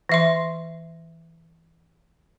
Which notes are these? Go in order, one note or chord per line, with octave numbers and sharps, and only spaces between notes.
E3 E5 C6